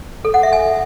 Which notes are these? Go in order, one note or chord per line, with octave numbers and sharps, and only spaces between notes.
A4
F#5
E5
G#5